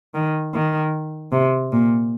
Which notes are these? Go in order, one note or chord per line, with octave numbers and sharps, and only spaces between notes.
D#3
D#3
C3
A#2